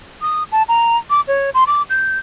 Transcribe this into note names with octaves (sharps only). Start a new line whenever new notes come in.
D#6
A5
A#5
D6
C#5
C6
D6
G6